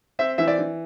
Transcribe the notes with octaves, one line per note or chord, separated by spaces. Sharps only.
C4 E5
E3 E5
D5
E3